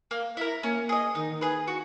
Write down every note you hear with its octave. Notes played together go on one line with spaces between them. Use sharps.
A#3
E4 A#4
A#3 C#4
G#4 D#5
D#3 D#4
G#4 B4
F#4